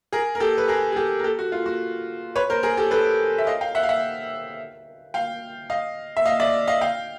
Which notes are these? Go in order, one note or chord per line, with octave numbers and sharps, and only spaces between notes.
G#4 A#4
A#4
G4 A4
B4
G#4 A#4
G#4
G4 A4
A#4
G4 A4
F#4
F4
F#4
B4 C#5
A#4 C5
G#4 A#4
G4 A4
A4 B4
E5
D#5 F5
F5 G5
E5 F#5
F5
E5 F#5
F5 G5
D#5 F5
E5
D#5 F5
D5 E5
D#5 F5
F5 G5